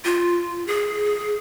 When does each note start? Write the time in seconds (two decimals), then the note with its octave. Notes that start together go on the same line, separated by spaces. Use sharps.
0.05 F4
0.67 G#4